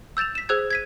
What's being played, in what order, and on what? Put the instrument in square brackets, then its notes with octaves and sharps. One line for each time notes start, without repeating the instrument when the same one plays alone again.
[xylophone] E6 G6 A6 E7 F7
B6 E7
G#4 C5 E6 F#6 G#6
G#6 B6 D#7